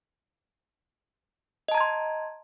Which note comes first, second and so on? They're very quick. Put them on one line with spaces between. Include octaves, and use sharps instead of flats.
D#5 A5 A#5 G#6 C6